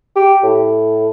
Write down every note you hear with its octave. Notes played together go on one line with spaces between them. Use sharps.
G4
A2